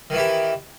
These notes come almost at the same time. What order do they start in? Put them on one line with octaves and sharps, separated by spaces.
D#3 E3 E4 G4